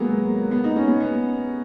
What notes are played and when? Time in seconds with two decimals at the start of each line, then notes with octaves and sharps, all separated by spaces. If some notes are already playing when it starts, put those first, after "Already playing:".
Already playing: F#3 G#3 A#3 B3
0.51 B3
0.64 D#4
0.76 C#4
0.88 B3
1.00 B3